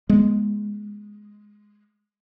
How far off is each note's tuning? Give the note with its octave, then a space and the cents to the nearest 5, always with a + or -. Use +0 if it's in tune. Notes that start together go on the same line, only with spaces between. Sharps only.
G#3 +0 B3 -30